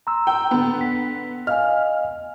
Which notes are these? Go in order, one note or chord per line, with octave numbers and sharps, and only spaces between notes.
A#5 C6 E6
G5
D3 B3
B6
D#5 F5 G#5 F6